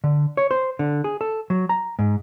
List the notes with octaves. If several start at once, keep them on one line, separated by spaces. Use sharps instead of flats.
D3
C#5
C5
D3
G#4
A4
F#3
A#5
G#2